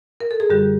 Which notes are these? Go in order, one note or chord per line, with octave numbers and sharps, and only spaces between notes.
A#4
A4
G#4
F#2 D3 G3 G4